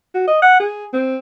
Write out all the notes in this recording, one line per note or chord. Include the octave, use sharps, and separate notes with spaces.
F#4
D#5
F#5
G#4
C4